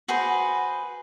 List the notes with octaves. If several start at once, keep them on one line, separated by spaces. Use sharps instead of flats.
F#4 G#4 B4 C5